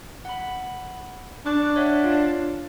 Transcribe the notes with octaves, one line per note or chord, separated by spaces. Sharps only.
F#5 B5
D4 C#6 D6 F#6
C#5 E5 F#5
F4 F5